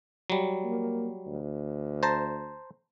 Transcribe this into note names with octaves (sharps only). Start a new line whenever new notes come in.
F#3 G3
A#3
D2
C5 A5 A#5